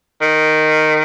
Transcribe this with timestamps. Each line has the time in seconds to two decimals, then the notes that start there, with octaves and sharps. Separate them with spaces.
0.22 D#3